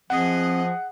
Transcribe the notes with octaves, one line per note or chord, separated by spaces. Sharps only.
F3 C4 G#4 D#5 F#5